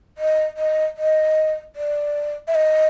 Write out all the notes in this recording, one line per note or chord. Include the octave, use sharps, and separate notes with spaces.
D#5
D#5
D#5
D5
E5
D#5